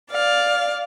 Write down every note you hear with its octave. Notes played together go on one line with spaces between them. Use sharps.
D5 F5